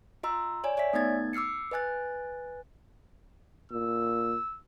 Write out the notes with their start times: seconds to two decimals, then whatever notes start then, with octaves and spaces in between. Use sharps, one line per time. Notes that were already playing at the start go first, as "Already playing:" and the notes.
0.23 F4 D#5 A#5 C6 E6
0.64 C#5 D5 G#5
0.77 C#5 D5 E5 G#5 B6
0.93 A3 B3 D#4 G#6 A6
1.33 D6 E6 F6 C7 C#7
1.71 B4 D#5 G#5 F#6 A6
3.71 A#2 E6